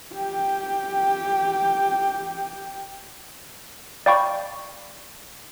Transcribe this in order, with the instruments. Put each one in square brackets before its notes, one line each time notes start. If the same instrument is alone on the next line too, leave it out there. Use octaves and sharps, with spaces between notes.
[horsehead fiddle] G4 G5
[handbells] D5 F5 G5 B5 C#6